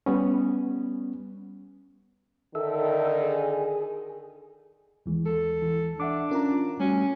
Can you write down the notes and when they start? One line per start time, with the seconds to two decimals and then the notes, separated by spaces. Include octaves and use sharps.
0.06 G3 B3 C#4
2.55 D3 D#3 A4 E5
3.21 G#4
5.06 D#2 E3 G#3
5.26 A4
5.62 E3
6.00 D4 E5 F#5 D6
6.31 C#4 F4 A#4 A#5
6.80 G3 A3 C#4 F#4